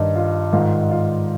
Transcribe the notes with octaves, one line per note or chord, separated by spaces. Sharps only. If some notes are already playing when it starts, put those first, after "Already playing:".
Already playing: G2 D#3 D#4
F4
G#2 D#3 F4
F4